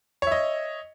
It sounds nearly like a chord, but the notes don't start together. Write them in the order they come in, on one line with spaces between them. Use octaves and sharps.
C#5 E5 D#5